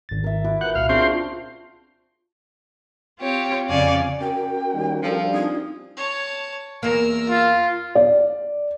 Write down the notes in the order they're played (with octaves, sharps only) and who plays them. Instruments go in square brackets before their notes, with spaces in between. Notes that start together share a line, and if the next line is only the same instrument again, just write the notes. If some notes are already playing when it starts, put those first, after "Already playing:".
[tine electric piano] G#1 A6
[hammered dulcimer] A#4 E5
E4 F#4 D6
[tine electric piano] A#4 B4 G6 [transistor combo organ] F#5
[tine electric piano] C2 A#2 [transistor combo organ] F5
[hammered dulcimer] C#3 D4 F4 [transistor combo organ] C4 C5 [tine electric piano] C#6
[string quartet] C4 F4 G4 C#5
F2 C#3 C#4 D5 F5 G#5
[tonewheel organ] C#4 F#4 A#4 [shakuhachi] G5
[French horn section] D#2 D#3 G3
[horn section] F3 [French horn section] G3 D4 [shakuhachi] A4
[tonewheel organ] C4 D#4 F4 [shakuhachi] D#6
[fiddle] C#5 A5
[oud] E2 A#3 [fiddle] A#4 E6
[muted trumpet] F4
[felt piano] D5